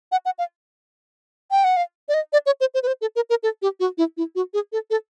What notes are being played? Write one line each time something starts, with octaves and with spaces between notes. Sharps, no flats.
F#5
F#5
F5
G5
F#5
F5
D5
D#5
D5
C#5
C5
C5
B4
C5
A4
A#4
A#4
A4
G4
F#4
E4
E4
F#4
G#4
A4
A4